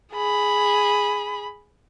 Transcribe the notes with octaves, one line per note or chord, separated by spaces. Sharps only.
G#4 B5